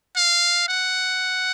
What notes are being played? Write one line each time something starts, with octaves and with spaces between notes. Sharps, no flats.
F5
F#5